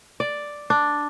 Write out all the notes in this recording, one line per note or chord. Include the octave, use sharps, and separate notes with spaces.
D5
D4